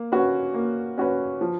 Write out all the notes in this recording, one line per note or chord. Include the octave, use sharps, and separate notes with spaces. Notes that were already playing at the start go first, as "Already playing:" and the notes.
Already playing: A#3
C#4 F#4 B4
A#3
C#4 F#4 B4
F3